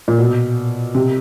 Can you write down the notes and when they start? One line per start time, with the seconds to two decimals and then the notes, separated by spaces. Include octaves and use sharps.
0.08 A#2
0.18 B2
0.95 C3